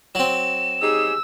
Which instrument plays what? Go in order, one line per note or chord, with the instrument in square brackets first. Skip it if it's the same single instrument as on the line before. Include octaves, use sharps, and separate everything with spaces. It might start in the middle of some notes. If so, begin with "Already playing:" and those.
[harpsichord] F#3 C4 [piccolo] E7
[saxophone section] D#4 G4 G#4 [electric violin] E6